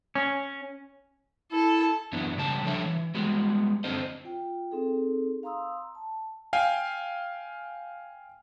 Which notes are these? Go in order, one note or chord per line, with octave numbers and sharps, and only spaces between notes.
C#4
E4 A4
F#2 E3 B3 D4 E4
C#3 G3 G4 A5
F3 G3 D4 A4 C#5 E5
E3
G3 G#3 B3 F#4
F#2 D3 C4 C5 D#5
F4 G5
C4 D#4 G#4 A4
F5 A#5 C6 D#6 E6
A5
F5 G5 G#5